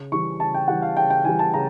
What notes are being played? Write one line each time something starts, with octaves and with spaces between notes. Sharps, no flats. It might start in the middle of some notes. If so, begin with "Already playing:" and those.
Already playing: C#3
E3 G3 C#6
C#3 A5
G5
E3 G3 F#5
F5
C#3 G5
G5
E3 G3 G#5
A5
C#3 A#5